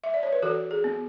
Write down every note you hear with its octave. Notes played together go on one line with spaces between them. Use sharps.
E5
D5
C#5
B4
E3 F#4 A4
G#4
B3